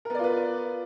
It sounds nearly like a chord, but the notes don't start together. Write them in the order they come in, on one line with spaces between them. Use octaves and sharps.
A#4 B3 D5 F4 B4